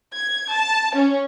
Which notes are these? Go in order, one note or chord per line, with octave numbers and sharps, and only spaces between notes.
G#6
A5
C#4